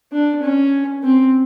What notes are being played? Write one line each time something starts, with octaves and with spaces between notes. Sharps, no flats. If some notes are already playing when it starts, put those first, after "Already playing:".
D4
C#4
C4